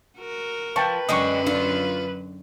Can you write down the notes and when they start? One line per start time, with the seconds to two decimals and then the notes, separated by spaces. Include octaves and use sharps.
0.19 F#4 A#4
0.76 F3 B4 G5 A5 C#6
1.09 F#2 D3 F#3 G#3 D4 G4 C#6 D#6
1.47 D4 F4